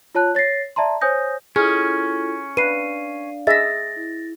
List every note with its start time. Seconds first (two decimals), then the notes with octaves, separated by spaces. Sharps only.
0.15 F4 C#5 A5 F#6
0.35 C#5 A6 A#6 C7
0.76 D5 E5 A5 A#5 C6
1.01 C5 C#5 G#5 D#6 G6 A#6
1.56 C#4 E4 F4 G#4 A4 F6
2.57 D4 B4 D5 F5 C7 D#7
3.47 G#4 D#5 E5 A6 A#6
3.96 E4